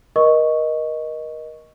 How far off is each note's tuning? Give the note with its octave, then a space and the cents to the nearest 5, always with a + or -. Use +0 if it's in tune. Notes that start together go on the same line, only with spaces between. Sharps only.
A#4 +30 D#5 +0 C#6 +0